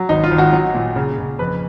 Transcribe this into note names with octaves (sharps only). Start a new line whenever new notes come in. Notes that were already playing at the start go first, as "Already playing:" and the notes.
Already playing: F#3
G#1 D#4
F4
G#1
F#4
F#3
A#2
C#3
C#3
F2 B4